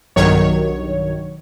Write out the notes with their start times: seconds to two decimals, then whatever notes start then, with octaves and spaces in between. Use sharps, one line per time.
0.16 B1 G2 D#3 F#3 C#5